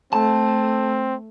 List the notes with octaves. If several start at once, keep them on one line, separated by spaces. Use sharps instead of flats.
A3 C4 A5